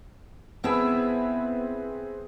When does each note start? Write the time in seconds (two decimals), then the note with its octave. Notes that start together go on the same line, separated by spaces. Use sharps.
0.64 B3 C4 E4 G#4 B4 E6